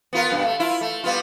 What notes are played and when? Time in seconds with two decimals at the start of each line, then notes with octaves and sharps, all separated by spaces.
0.13 B3 F4 A#4
0.31 G2 B2
0.44 A3
0.60 E4 F4
0.81 A3
1.04 G3 B3 F4